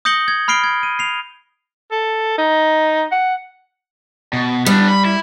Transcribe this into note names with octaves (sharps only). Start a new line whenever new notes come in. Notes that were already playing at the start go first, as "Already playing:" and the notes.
D#6 G6 A#6 C#7 F#7 G7
G#6
B5 F6 C7 D7 G7
G#6
D#7
C7 F7
A4
D#4
F#5
B2
G3 B3 D4
B5
E4